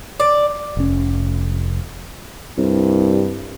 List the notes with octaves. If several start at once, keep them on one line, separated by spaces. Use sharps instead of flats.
D5
F1 C#4
C2 G2